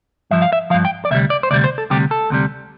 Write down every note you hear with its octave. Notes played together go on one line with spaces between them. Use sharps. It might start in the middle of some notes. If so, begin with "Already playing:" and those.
G2 F3 E5
F5
E5
G2 F3 F5
G5
D5
D2 C3 G3 E5
D5
C5
D2 C3 G3 D5
C5
A4
D2 C3 G3 G4
A4
D2 C3 G3